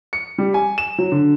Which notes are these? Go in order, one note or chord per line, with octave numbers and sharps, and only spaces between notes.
C#7
G3
G#5
E7
F#3
D3